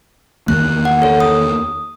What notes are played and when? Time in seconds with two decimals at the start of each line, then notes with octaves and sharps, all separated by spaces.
0.48 E2 D#3 A#3 F#6
0.85 F#5
1.02 A4 C#5
1.20 D#6